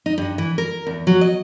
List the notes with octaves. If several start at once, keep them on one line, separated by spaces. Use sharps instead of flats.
D#4
G2
E3
A#4
E2
F#3
D#5